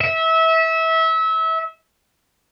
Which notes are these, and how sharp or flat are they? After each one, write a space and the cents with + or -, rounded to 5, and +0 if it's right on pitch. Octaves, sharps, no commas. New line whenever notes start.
E5 -25